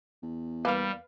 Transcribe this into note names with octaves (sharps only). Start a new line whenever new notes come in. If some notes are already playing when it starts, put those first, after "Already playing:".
E2
G3 A#3 B4 F5